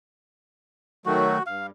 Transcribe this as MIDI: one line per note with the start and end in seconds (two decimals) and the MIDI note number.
1.06 1.38 51
1.06 1.38 54
1.06 1.38 57
1.06 1.43 66
1.47 1.70 43
1.47 1.66 77